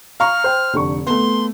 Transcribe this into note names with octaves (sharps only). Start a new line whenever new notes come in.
F5 A#5 C#6 F6
C5 G5
F1 D3 C#6
A3 B3 C6